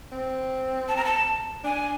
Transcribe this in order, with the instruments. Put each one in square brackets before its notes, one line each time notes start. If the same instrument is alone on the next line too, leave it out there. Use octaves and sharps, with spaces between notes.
[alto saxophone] C4
[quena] A5
A#5
A5
[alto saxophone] D4 [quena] G#5